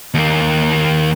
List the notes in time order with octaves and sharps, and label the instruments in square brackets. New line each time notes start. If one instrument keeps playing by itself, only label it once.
[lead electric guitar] D#2 A#3